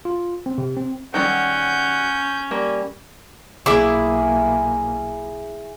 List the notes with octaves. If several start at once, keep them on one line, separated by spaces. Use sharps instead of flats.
F4
C4
C3
C4
D#3 F#3 G3 C#4 F#5 G6
G3 A#3
B1 A#3 E4 G#4 E5 D6